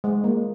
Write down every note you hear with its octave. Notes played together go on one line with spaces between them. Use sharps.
G#3
A#3